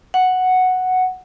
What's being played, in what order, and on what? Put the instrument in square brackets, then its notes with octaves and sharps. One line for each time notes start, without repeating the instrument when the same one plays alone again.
[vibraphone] F#5